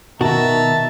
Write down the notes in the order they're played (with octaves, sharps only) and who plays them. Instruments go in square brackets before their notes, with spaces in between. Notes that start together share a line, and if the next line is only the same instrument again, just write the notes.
[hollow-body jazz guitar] B2 F#4 [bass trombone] D#3 [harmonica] E5 A5 A#5